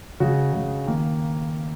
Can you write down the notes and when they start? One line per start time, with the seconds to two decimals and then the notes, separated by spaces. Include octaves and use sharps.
0.20 C#3 G#3 F#4
0.53 C#3 G#3
0.87 D#3 A#3